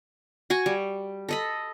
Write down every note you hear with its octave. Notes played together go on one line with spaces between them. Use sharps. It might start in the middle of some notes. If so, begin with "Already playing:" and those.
F#4 G#5 C#6
G3
A4 D#5 B5